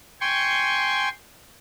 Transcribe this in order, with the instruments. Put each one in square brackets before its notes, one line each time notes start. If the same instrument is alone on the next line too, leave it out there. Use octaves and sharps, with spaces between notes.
[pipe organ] G5 G#5 C6 C#6